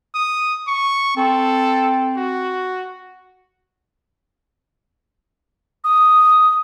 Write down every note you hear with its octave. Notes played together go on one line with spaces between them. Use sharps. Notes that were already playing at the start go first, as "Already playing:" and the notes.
D#6
C#6
C4 A4
F#4
D#6